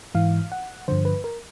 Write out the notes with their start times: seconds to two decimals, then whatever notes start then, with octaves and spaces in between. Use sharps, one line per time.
0.15 G#2 E3 F5
0.52 F#5
0.88 G2 D3 F3 C5
1.05 B4
1.24 A#4